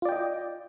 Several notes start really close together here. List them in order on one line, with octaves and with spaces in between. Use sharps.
F4 D5 G5 D#5